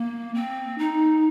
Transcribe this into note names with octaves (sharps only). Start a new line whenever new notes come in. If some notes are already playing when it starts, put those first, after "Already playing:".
Already playing: A#3
C4
D#4